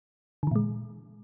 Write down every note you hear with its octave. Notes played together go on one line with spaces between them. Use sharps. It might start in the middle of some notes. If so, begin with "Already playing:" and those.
A#2 D3 E3 G#3